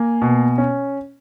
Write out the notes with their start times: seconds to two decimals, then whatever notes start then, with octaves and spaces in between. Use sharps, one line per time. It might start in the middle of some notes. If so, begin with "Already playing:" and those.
Already playing: A#3 G#5
0.22 B2
0.58 C#4